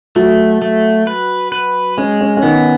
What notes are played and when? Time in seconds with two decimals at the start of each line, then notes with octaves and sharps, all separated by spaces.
0.16 F#3 A3 F#4
0.62 A3
1.07 B4
1.52 B4
1.97 G#3 C#4
2.21 C#4
2.37 C#4
2.43 D#3 B3 D#4